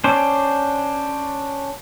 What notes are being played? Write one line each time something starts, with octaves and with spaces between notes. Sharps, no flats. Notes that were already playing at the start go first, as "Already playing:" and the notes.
C#4 D4 C5